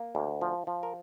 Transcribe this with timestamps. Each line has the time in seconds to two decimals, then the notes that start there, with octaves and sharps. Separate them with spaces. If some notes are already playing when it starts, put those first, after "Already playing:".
Already playing: A#3
0.15 D2
0.41 F3
0.67 F3
0.83 A#4